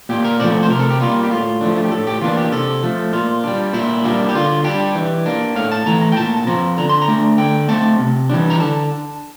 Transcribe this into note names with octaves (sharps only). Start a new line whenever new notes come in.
A#2 G4
A#4
F3 A3 C4 D5
C5
C3 A#4
A4
G4
G3 A#3 F4
G4
A2 F4
F3 A3 D4
F4
G4
A2 A4
G4
E3 A#3 D4 F4
G4
C3 A4
F3 A3
A#2 F4
G3 D4
A#2 E4
G3 A#3 D4
G4
D3 F4
G3 D4 G4
E3
A#3 D4
A2 F5
A5
E3 A3 A#5
A#5
G5
A#2 A5
A5
F3 C4 A#5
D3 A#5
C6
A#5
A3 D4
D3 G5
A3 C4 A5
C3
E3 G3 D4
A#5
D3 A5